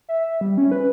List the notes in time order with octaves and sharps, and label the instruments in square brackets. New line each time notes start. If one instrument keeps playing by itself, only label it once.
[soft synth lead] E5
G3
C#4
B4